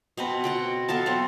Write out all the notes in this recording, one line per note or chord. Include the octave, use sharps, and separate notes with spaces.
B2 C4 B4
F#4 F#5 G5
B3 A4 F5 A5
F#3 C4